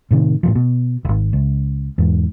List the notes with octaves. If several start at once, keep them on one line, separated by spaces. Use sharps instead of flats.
A2 C3 D#3
A2 D3 F3
B2
D#1 G#1
C#2
E2 G#2